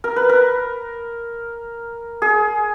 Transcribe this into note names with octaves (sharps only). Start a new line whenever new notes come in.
A#4
B4
A#4
G#4